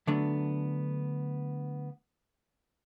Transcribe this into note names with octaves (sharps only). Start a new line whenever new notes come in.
D3 F#3 A3 B3 D4